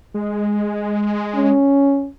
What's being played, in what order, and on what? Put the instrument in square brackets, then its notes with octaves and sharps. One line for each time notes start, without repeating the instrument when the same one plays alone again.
[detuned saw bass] G#3
[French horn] C#4